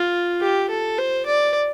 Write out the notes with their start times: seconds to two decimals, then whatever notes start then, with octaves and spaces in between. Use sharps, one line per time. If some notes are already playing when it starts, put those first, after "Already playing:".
Already playing: F4
0.41 G4
0.70 A4
0.98 C5
1.26 D5